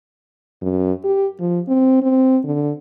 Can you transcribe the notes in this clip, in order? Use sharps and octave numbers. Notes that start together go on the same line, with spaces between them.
F#2
G4
F3
C4
C4
D3